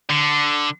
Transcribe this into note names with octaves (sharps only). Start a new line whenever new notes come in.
D3